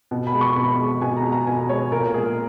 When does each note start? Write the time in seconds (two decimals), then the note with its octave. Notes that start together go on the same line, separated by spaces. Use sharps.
0.11 B2
0.27 B5
0.34 G#3
0.41 C#6
0.57 B2 B5
0.79 G#3
1.01 B2 G#5
1.17 A#5
1.24 G#3
1.32 A#5
1.47 B2 G#5
1.69 G#3 C#5
1.92 A#2 A#4
2.14 G#3 G#4